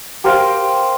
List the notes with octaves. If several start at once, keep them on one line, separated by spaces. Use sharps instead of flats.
G4 A#4 C5 F5